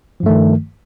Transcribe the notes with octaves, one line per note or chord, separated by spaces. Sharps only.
G2 D#3 F3 A3